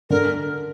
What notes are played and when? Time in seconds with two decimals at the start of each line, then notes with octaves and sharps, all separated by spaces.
0.10 D3 A#4